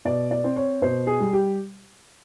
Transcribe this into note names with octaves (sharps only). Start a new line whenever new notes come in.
B2 D5
D5
C4
C#5
B2 C5
G#4
G3
G4